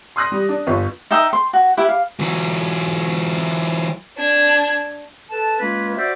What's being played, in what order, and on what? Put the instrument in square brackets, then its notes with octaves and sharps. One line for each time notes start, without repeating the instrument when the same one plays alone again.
[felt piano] C6 D#6 F#6 A#6
G3
D4
G1 F4 B4 C#6
[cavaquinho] D#4 E5 G5 D#6
C6
F#4
E4 G4 B4
F5
[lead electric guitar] E3 F#3
[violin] D4 G#6
[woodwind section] A4 B4 A5
G#3 A#3 C#4 F4 B4
F#4 C5 D5 E5